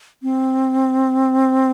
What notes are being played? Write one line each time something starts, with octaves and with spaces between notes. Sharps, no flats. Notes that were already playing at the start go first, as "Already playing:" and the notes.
C4